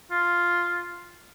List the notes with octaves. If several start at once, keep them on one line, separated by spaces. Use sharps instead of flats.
F4